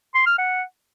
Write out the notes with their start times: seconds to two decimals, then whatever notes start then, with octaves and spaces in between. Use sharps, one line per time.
0.15 C6
0.26 F6
0.38 F#5